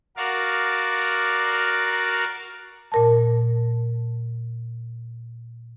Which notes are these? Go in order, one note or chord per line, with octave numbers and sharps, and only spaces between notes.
F#4 A#4 D5 F5
A#2 A#4 A5